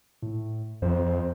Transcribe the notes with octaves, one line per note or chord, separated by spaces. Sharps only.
A2
F2 C5